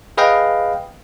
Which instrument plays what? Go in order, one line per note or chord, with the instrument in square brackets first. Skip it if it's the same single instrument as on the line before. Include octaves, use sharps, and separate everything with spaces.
[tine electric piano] G#4 B4 D#5 F5 G5